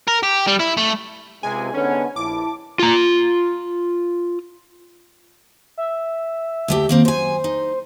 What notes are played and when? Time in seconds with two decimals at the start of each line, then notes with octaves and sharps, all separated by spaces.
0.08 A#4
0.23 G4
0.47 G3
0.60 E4
0.77 A3
1.43 C#2 C3 G#3 G#5
1.73 G#2 D3 B3 C#4
2.16 A#1 E4 A5 D6
2.79 F4 A#5
5.78 E5
6.68 D2 A3 G4
6.89 D#3 A#3 C4
7.05 F#2 C5 G#5
7.44 D#4